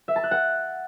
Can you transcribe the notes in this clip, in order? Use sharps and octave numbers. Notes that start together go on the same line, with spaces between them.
E5
A5
F#6
F#5